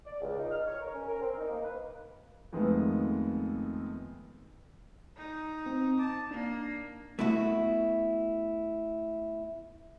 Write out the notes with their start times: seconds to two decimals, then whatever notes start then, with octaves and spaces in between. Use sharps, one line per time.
0.05 D5
0.21 C#2
0.38 D#4
0.50 F6
0.66 C#5
0.80 A#4
0.93 C#4
1.08 A#4
1.21 C4
1.37 D#4
1.49 A#3
1.62 B4
2.53 F2 D#3 G#3 A3 B3
5.16 D#4
5.66 C4
5.99 A5 D6
6.31 A#3 D4
7.19 A3 B3 E4 F#4